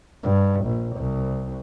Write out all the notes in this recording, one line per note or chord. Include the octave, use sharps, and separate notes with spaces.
G2
A#1
C2